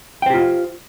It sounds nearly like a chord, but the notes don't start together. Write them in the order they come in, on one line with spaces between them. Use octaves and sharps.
G5 C5 G4 F4